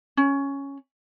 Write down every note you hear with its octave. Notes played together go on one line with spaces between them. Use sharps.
C#4